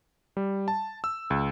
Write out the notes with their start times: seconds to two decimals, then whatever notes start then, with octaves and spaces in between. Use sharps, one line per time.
0.37 G3
0.68 A5
1.04 E6
1.30 C#2